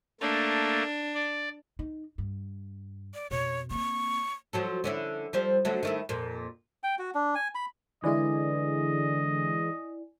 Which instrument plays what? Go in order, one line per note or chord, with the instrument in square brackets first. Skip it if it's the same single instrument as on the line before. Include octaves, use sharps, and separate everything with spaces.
[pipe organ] A3 A#3 [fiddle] D4
[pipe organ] D5
[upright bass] D#4
G2
[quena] D5
[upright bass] F2 B2 [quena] C#5
[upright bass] A#3 C4 [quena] C#6
[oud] F3 F#3 A4
D3 C#4 E4
F3 G3 C4
D3 F#3 A3
D#3 A3 E4
F2 A#2
[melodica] G5
F#4
D4
G#5
B5
[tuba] D3 [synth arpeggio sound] E3 G#3 [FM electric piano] E4 D5 G#5 [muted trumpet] D#5